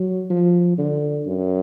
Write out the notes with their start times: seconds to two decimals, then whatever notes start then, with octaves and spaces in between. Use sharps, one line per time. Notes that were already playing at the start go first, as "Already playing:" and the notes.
Already playing: F#3
0.30 F3
0.78 D3
1.26 F#2